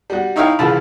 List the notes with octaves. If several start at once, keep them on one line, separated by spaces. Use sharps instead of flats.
G3 F#4
D#4 E4 C#5 E5 F5 G5
C2 C#3 E3 F4 A5 B5